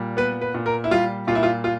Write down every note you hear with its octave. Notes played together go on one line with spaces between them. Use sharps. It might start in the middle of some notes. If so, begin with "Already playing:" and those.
Already playing: A#2 G3
B3 B4
B4
A#2
A#4
E4
G3 F4
A#2 F4
E4
F4
F4